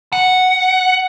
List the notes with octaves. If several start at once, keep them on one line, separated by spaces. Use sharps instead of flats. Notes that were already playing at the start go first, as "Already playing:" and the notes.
F#5